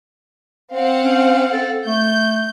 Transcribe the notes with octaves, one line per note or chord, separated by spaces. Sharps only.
C4 F5 F#5
C#4
A4
A3 G6